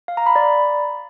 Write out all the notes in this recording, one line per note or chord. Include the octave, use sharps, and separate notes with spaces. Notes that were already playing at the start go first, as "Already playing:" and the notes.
F5
A#5
B5
D5